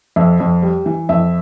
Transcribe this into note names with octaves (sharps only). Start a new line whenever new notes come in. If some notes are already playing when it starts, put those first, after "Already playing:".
F2 E5
F2
G3
E3
F2 E5